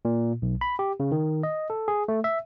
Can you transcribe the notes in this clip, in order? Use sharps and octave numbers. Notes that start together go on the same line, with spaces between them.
A#2
B1
B5
G4
C#3
D#3
D#5
A4
G#4
A3
E5